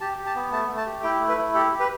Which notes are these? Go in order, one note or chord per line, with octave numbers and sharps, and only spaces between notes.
G4 A5
G4
A5
B3
A3 A5
A3
A5
G4
E4 G5
A3
B4
E4
G4 A4
G4
B4